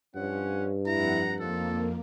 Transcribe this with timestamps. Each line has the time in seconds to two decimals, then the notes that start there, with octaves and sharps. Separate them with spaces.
0.15 G2 F3 C#4 F#5
0.87 F2 E4 F#5 A#5
1.40 F2 D3 D#3 F3 A#3 A4